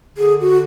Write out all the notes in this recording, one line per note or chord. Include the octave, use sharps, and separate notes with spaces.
D3 G#4
F#4